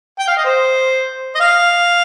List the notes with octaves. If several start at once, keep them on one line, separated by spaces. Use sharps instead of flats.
G5
F5
D#5
C5
D#5
F5